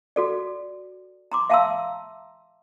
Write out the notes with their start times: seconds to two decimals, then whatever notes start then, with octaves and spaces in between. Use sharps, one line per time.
0.16 F#4 A4 D5
1.32 A#5 C6 D6
1.50 E5 F5 A5 A#5 C6 E6